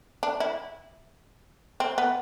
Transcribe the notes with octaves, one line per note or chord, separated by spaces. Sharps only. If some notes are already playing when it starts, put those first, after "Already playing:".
D4
E4
C4
B3